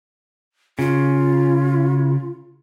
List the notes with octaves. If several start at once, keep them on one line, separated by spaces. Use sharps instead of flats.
C#3 F4